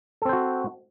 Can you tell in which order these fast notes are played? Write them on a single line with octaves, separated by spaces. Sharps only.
A4 C4 C5 F#4